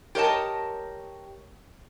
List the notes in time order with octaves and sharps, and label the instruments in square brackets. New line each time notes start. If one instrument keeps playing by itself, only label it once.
[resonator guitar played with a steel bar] G4 A#4 C#5 D#5 A5